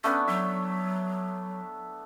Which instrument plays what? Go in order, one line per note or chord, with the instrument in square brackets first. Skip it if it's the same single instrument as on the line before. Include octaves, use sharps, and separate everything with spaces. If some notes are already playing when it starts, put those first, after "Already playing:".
[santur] A3 B3 D4 [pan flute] C#4
[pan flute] F#3 [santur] E5